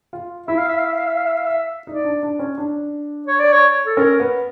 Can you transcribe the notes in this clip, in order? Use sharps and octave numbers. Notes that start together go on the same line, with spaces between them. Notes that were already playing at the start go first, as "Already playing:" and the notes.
F4
E4 E5
F5
E5
F5
E5
F5
E5
F5
E5
F5
E5
D#4 D5
D4
D4
C#4
D4
C#5
D5
C#5
A4
C#4 A#4
B3